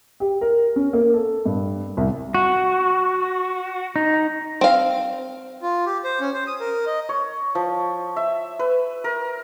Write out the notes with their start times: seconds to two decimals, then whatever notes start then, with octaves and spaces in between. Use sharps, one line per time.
0.20 G4
0.41 A#4
0.76 C#4
0.93 A#3
1.14 A4
1.45 G2
1.97 C2
2.34 F#4
3.96 D#4
4.61 C4 F5
5.62 F4
5.86 G4
6.04 C5
6.20 C#4
6.34 C5
6.47 D#6
6.60 A#4
6.86 D#5
7.09 C#5
7.55 F3
8.16 E5
8.59 B4
9.04 A#4